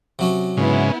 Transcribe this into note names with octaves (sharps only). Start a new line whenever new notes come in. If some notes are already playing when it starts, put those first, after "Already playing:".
C3 F#3 C#4
G#2 C#3 B3 E4